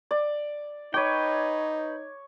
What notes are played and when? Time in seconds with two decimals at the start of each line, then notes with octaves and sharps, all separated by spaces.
0.11 D5
0.94 D#4 B4 C#5 G5 D6